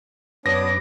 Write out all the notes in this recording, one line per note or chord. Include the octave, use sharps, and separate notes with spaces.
F#2 B3 D4 B4 C#5 D6 D#6 A#6